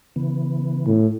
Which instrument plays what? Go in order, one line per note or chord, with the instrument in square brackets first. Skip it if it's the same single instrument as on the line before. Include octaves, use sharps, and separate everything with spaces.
[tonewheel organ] C#3 E3 B3
[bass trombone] A2